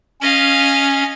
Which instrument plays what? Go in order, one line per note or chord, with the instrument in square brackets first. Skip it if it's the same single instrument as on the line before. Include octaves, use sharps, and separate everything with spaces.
[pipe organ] C#4 [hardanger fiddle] D#5 F5